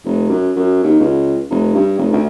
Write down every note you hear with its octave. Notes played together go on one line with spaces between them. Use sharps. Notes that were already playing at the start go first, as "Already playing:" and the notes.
F1
F#2
F#2
D#2
C#2
F1
G2
F1
D2